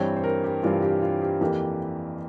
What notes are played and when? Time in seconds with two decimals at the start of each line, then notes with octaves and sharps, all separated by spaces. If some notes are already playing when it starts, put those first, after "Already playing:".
Already playing: G2 E3 G3 C4 C#5
0.16 C5
0.24 A#4
0.44 G4
0.63 G2 E3 G3 C4 F4
0.82 G4
1.02 F4
1.21 G4
1.41 F2 E3 A#3 G4